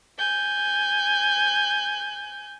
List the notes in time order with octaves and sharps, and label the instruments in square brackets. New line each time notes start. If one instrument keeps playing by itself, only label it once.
[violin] G#5 G6